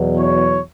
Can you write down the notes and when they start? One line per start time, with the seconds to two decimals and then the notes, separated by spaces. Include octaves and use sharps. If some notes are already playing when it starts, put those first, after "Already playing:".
Already playing: E2 B2 F#3
0.18 C#5